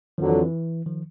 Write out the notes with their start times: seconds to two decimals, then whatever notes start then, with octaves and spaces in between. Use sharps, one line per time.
0.18 F2 D3 D#3 F3 F#3
0.30 E3
0.41 E3
0.86 D#3 F3